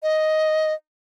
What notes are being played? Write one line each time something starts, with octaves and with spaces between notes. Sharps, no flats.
D#5